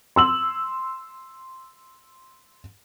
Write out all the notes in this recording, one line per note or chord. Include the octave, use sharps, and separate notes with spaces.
C6 E6 F#7